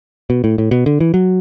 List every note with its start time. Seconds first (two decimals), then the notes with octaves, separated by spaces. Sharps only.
0.30 B2
0.44 A2
0.58 A2
0.71 B2
0.86 D3
1.00 E3
1.14 F#3